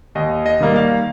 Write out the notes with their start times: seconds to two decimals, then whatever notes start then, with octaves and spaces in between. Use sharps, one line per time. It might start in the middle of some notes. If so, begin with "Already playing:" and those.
0.15 D#2 D#5
0.46 D#5
0.61 D#3 G3 A#3
0.76 F5